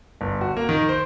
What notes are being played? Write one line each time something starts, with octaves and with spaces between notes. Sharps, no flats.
G1
F#4
A#3
D#3
C5